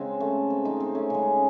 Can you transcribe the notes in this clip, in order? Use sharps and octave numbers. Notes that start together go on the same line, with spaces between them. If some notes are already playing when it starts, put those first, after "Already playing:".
Already playing: C#3 G#3 C4
A3
C4
C4 D#4
C4
A3 C#4
C#3 G#3